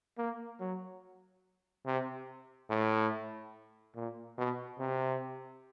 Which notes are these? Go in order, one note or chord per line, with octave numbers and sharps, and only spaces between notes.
A#3
F#3
C3
A2
A#2
B2
C3